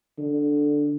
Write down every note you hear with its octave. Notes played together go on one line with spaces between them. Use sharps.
D3